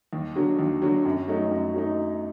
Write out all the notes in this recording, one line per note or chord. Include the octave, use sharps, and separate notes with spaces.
D#2
D3 F#3
D#2
D3 F#3
F#2
F#3 A3 D#4
F#2
F#3 A3 D#4